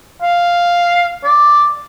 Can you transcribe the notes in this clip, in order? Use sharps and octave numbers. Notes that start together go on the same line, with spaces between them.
F5
D5